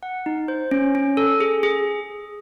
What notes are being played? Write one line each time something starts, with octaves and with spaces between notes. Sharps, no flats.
F#5
D#4
C5
C#4
C#4
A4
G#4
G#4